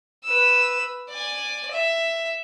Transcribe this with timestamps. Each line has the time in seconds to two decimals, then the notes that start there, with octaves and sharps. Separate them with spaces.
0.24 B4 E6
1.10 D5 G#5
1.71 E5